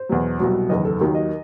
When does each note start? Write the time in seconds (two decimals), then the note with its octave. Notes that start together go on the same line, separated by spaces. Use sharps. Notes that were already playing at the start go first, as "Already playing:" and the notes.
Already playing: C5
0.09 E2 B2 F#3
0.39 C2 B2 F#3
0.69 F#1 E2 D#3 D#5
0.85 A4
1.00 D#2 D#3 F#3
1.15 D#5